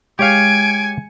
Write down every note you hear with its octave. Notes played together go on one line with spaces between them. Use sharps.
G#3 G4 C#5 F5 G#5 G#6 C#7 D7